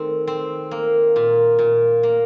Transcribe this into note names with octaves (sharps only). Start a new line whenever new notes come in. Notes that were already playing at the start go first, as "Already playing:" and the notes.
Already playing: D#3 A3 C4
C4
A#3
A#2
A#2
A#3